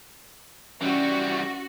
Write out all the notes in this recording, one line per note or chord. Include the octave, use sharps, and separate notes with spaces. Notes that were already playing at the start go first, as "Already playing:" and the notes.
E3 G3 C#4 F#4